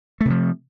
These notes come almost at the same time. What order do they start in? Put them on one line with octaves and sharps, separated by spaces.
A3 C3 F3